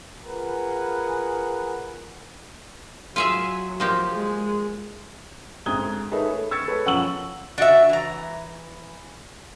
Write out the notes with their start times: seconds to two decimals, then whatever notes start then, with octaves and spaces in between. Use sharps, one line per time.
0.25 F4 G#4 A#4 B4 F#5
3.16 F#3 F4 G#4 E5
3.80 F3 A#3 G4
4.14 G#3
5.66 D2 G#2 C4 D#6 G#6 G7
6.12 D#4 G#4 A4 B4 C#5 E5
6.29 A3
6.51 C#6 E6 G#6 A6 C#7
6.68 G#3 A4 B4 C#5
6.85 F#2 F3 F#5 C#6 E6 F#7
7.58 D4 F#4 D#5 E5
7.89 E3 A#5